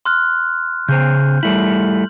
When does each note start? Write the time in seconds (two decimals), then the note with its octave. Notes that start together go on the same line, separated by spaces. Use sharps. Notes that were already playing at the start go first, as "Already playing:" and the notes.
0.05 C6 F6 F#6
0.89 C#3 G#4 C5 G6
1.43 G3 A3 E4 F#7